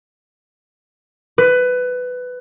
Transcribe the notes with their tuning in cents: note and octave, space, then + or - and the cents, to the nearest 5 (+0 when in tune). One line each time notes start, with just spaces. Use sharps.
B4 +15